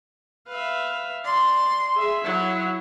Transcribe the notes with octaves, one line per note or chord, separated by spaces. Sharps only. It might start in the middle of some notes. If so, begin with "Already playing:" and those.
B4 E5 F5
D5 C6
G#4 E5
F#3 E4